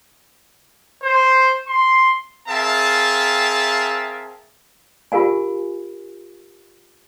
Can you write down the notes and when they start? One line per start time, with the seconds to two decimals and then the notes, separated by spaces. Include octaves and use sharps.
1.03 C5
1.67 C6
2.48 C4 G#4 A#4 E5 F5 A5
5.12 F4 G4 A#4 F5 G#5